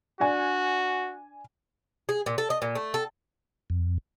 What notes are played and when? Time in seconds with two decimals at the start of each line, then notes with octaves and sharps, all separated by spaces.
0.20 D4 F#4 D5 G#5
2.09 G#4
2.26 A#2
2.38 A4
2.50 D#5
2.62 A#2
2.75 A3
2.94 A4
3.70 F2